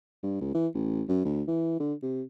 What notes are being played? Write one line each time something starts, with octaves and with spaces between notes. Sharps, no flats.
G2
C#2
E3
A1
F#2
D2
E3
D3
C3